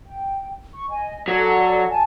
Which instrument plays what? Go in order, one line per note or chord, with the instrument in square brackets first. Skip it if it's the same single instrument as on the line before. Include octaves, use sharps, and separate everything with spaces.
[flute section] G5
C#6
D#5 G#5
[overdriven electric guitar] F#3 [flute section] A4 D5 F#5
[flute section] G#5 A5